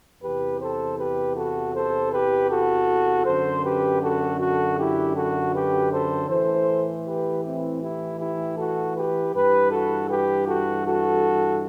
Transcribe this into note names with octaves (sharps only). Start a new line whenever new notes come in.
E2 C3 E3 G4 B4
A4 C5
G4 B4
F#4 A4
A4 C5
G4 B4
F#4 A4
F#2 D3 A4 C5
G4 B4
F#4 A4
F#4 A4
E4 G4
F#4 A4
G4 B4
A4 C5
A2 E3 A4 C5
G4 B4
C4 E4
E4 G4
E4 G4
F#4 A4
G4 B4
G2 E3 G4 B4
F#4 A4
G4 B4
F#4 A4
F#4 A4